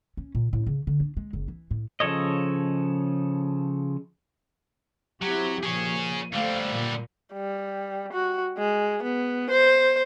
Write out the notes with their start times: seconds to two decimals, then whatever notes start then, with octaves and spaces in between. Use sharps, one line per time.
0.17 C#4
0.35 A#2
0.53 A2
0.67 C#3
0.87 D3
1.00 D4
1.17 G#3
1.33 F#1
1.48 E3
1.71 A2
2.00 C#3 F3 A4 C#5 D#5
5.22 F#3 C4 E4 G4
5.63 A#2 F3 G#4 C#5
6.34 D3 G3 A3 C5 F5
6.71 A#2
7.33 G3
8.13 F#4
8.58 G#3
9.03 B3
9.51 C5